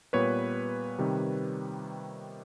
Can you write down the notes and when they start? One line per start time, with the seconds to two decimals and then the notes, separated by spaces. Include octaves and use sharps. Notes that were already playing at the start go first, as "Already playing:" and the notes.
0.13 A#2 G3 B3 B4 C#5
0.99 C3 D#3 G3